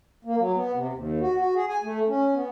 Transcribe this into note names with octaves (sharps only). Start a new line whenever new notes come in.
A#3
F#3
B3
C3
D#2
F#4
F#4
G#4
G#5
A3
C#4
B3